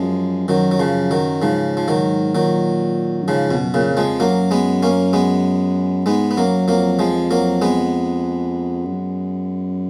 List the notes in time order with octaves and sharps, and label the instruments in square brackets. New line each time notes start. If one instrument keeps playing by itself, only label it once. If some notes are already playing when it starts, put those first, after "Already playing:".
Already playing: [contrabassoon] F#2 [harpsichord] F3 G#3
[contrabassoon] F#2 [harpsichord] D#3 F#3
[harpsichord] F#3
C#3 F3
D#3 F#3
[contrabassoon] G#2 [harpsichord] C#3 F3
[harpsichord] F3
D#3 F#3
[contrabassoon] A#2 [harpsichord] D#3 F#3
[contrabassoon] F#2
[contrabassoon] G#2 [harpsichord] C#3 F3
[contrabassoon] F2 [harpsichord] B2
[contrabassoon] F#2
[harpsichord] A#2 C#3
[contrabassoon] F2
[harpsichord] F3 G#3
[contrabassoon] F#2 [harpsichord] F#3 A#3
[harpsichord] G#3 B3
A#3 C#4
G#3 B3
[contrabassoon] G#2 [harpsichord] G#3 B3
[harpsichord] B3
[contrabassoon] F#2 [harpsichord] F#3 A#3
[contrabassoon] F2 [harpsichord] F#3 A#3
[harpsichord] F3 G#3
F#3 A#3
G#3 B3
[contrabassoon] F#2